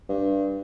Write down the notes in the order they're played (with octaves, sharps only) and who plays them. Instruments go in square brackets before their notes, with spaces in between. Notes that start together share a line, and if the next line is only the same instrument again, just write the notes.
[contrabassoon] G2